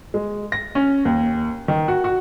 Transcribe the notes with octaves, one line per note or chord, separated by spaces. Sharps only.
G#3
A#6
C#4
D#2
D#3
F#4
F#4